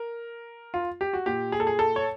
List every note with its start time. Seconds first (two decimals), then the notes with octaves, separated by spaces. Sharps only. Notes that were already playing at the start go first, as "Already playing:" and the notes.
Already playing: A#4
0.74 F4
1.01 G4
1.13 F#4
1.26 A#2 G4
1.52 G#4
1.60 A4
1.67 G#4
1.79 A4
1.96 C#5